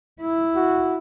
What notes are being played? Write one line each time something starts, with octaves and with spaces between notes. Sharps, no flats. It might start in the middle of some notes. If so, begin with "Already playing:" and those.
E4
F#4